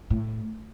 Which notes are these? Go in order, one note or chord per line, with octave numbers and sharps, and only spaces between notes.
A2